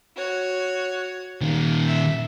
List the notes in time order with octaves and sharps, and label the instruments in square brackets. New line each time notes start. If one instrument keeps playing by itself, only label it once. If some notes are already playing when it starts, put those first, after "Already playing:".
[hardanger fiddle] F#4 C#5
[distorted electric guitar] A#2 D#3
[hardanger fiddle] E5